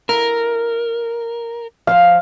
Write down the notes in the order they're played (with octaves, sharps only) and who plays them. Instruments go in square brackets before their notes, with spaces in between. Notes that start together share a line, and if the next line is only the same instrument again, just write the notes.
[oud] E4 A4 [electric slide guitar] A#4
[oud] F3 F4 C5 [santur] F5